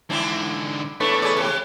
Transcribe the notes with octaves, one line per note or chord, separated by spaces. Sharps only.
G#2 D3 C4 D4 E4
E2 A3 D4 A4 B4 C#5
G#4 D5
C3 G4